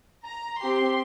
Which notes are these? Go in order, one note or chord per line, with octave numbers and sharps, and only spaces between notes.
A#5
C4 G4 C6